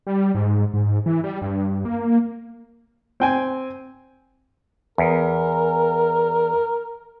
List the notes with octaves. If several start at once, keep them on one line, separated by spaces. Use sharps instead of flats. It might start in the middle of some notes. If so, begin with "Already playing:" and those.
G3
G#2
G#2
E3
G3
G2
A#3
C4 G5 G#5
E2 A#4